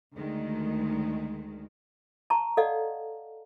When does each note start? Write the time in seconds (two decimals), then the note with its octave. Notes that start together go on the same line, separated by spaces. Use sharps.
0.15 D2 D#3 G#3
2.30 A5 A#5 C#6
2.57 A4 D5 D#5 F5 F#5